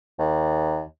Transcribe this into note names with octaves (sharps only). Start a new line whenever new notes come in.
D#2